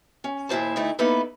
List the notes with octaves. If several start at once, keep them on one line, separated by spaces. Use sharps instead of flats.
C#4
D#2 A#2 E4 C5 A5
D2 A3 D#4 E4
A#3 B3 D#4 E4 A4 B4